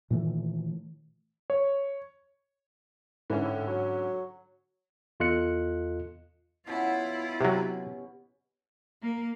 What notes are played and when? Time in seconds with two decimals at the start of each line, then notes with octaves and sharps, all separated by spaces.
0.10 A#2 D#3 E3 A3
1.50 C#5
3.30 G#2 D3 E3 C#4
3.45 A2
3.67 F#3
5.20 E2 F4 A4 D#5 F#6 C#7
6.67 B2 C#4 E4 F4 F#5
7.41 C3 F#3 G4
9.02 A#3